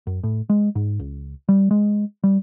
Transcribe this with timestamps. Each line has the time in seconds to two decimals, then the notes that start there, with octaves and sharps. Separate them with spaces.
0.07 F#2
0.24 A2
0.50 G#3
0.75 G#2
1.00 C#2
1.49 G3
1.71 G#3
2.24 G3